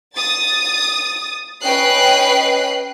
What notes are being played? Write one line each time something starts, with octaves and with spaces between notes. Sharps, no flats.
D#6 A6
C#4 B4 D#5 G5 F#6 C7